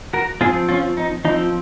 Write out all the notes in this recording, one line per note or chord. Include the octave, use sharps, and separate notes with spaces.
F#4 A#4
F3 C4 F4 G#4
C#4 F4
D#4
F3 C4 D#4